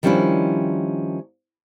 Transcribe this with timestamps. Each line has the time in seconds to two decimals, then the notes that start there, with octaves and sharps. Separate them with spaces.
0.03 D#3 F3 G3 C#4 D4 E4